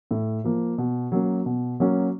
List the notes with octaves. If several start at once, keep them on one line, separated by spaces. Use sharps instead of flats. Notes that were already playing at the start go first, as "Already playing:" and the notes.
A2
F3 A#3
B2
F#3 A#3 C#4
B2
F#3 A#3 C#4